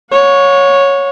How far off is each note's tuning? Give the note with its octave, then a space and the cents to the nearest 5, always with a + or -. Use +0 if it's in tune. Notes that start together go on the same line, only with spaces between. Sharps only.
C#5 +0 F#5 -40